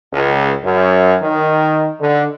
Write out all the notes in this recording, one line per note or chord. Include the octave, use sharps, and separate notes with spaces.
C#2
F#2
D#3
D3